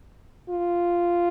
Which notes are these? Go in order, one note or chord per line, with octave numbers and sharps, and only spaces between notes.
F4